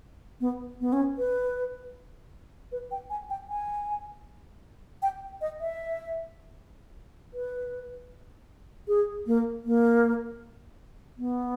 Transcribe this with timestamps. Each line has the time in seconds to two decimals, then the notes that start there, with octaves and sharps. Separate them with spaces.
0.40 B3
0.81 B3
0.93 C#4
1.18 B4
2.72 B4
2.91 G5
3.10 G#5
3.30 G5
3.49 G#5
5.02 G5
5.41 D#5
5.60 E5
7.33 B4
8.88 G#4
9.26 A#3
9.65 A#3
11.18 B3